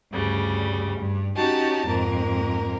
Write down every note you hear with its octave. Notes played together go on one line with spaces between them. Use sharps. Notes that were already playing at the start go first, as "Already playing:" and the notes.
D2 G2 C#3 G3
G2
C#4 D#4 F#4 G4 A5
F2 G#2 A#3 A#4